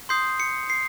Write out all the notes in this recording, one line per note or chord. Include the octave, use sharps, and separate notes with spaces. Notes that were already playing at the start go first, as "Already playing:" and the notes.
C6 D#6 G6 C7
C#7
C7